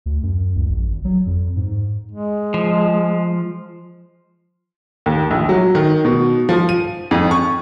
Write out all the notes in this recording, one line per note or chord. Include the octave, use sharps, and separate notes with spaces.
D2
F#2
C#2
A#1
G#1
F#3
F2
G#2
G#3
F3
D#2
A#1
F#3
D#3
B2
F3
D#7
F2
C#6